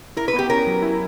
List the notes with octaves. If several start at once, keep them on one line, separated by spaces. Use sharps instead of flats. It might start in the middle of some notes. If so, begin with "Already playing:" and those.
E4 A#4
B4
B3
G4
C#4 A#4
F#3
E4